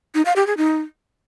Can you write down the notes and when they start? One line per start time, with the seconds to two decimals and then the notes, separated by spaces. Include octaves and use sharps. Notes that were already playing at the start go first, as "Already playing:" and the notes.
0.15 D#4
0.25 F5
0.36 G4
0.47 G#4
0.57 D#4